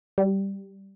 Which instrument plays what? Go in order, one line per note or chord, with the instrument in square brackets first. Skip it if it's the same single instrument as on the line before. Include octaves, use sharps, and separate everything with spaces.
[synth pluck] G3